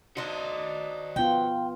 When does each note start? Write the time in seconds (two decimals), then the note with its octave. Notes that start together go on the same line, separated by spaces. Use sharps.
0.17 D4 D#4 F#4 C5
1.16 B3 F4 G5